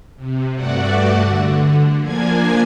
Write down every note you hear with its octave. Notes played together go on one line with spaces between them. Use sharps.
C3
G2 A3 F#4 D5 F#5
D3
F3 A#3 D4 G#5 G#6